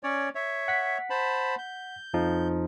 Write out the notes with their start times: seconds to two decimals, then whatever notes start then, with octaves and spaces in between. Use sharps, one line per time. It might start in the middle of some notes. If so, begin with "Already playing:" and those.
0.03 C#4 C#5 D5
0.35 C#5 E5
0.68 F#5 B6
1.10 C5 A5 B5
1.58 G6
2.14 F2 F3 D#4